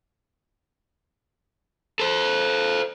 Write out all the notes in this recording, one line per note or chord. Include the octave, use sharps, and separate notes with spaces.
A4 C5